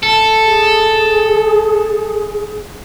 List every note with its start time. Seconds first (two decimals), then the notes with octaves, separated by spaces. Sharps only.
0.03 A4
0.45 G#4